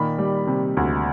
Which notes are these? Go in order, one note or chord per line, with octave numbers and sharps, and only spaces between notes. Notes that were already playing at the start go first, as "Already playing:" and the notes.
Already playing: A#2 D#3 B5
G3
C3
D2